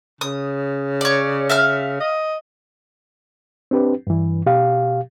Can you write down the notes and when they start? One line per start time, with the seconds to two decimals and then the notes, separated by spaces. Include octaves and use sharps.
0.21 C#3 D#6
1.01 C#5 D5
1.49 E5 F5 F6
2.00 D#5
3.71 C4 D4 G4 B4
4.07 G2 E3
4.46 B2 G4 F5